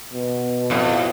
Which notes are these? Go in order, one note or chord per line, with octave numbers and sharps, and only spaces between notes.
B2
F2 A2